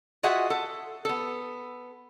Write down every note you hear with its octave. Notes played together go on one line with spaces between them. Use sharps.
F4 F#4 G#4 D#5 E5 F#5
A4
B3 A4